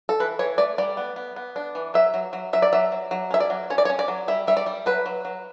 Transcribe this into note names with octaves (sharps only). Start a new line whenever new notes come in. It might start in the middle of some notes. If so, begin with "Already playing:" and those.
A4
E3 B4
E3 C#5
A3 D5
G3 D5
B3
B3
B3
D4
E3
F#3 E5
F#3
F#3
F#3 E5
D5
F#3 E5
F#3
F#3
C#4 E5
D5
F#3
C#4 C#5
D5
C#5
C#4
D5
F#3
G3 E5
G3 E5
D5
G3
F#3 B4
F#3
F#3